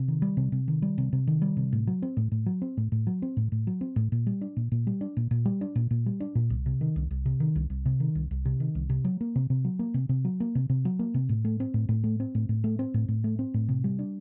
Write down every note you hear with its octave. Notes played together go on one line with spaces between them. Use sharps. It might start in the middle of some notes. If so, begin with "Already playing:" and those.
Already playing: C3
D#3
G3
C3
C3
D#3
G3
C3
C3
D#3
G3
C3
A2
F#3
C4
A2
A2
F#3
C4
A2
A2
F#3
C4
A2
A2
F#3
C4
A2
A#2
G3
D4
A#2
A#2
G3
D4
A#2
A#2
G3
D4
A#2
A#2
G3
D4
A#2
C2
C3
D#3
C2
C2
C3
D#3
C2
C2
C3
D#3
C2
C2
C3
D#3
C2
C3
F#3
A#3
C3
C3
F#3
A#3
C3
C3
F#3
A#3
C3
C3
F#3
A#3
C3
A2
A3
C4
A2
A2
A3
C4
A2
A2
A3
C4
A2
A2
A3
C4
A2
C3
G3
D4